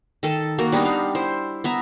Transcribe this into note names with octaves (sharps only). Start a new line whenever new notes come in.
D#3 A4 A5
A#3 F#4 A#4
G3 B3 D4 D#4
F5
E4 C5
B3 E5 A#5